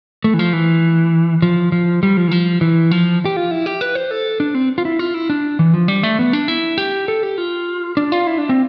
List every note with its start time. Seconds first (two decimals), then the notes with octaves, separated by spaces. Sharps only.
0.24 A3
0.34 E3
0.39 F3
0.53 E3
1.42 F3
1.72 F3
2.03 G3
2.17 F3
2.28 E3
2.31 F3
2.61 E3
2.91 F3
3.25 G4
3.37 F4
3.51 E4
3.66 G4
3.81 B4
3.95 C5
4.11 A4
4.40 D4
4.55 C4
4.78 F4
4.85 E4
4.99 F4
5.14 E4
5.30 D4
5.59 E3
5.74 F3
5.88 G3
6.03 A3
6.19 B3
6.33 D4
6.48 E4
6.78 G4
7.08 A4
7.23 G4
7.38 F4
7.97 D4
8.12 F4
8.27 E4
8.38 D4
8.49 C4